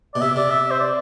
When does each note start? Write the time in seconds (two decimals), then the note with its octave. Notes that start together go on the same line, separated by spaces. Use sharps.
0.14 B2 D5
0.21 C3 E5
0.36 C3 D5
0.50 E5
0.71 C5
0.80 D5